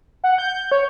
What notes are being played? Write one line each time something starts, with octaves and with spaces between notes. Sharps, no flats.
F#5
G6
C#5